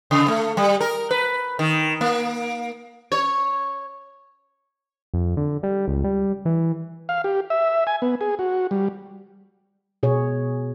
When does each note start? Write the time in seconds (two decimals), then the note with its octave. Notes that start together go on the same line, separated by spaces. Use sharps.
0.11 C#3
0.28 A3
0.57 G3
0.81 A#4
1.11 B4
1.59 D#3
2.01 A#3
3.12 C#5
5.14 F2
5.37 D3
5.63 G3
5.88 C#2
6.04 G3
6.45 E3
7.09 F5
7.24 G4
7.50 E5
7.87 G#5
8.02 B3
8.21 G#4
8.39 F#4
8.71 G3
10.03 B2 G#4 C#5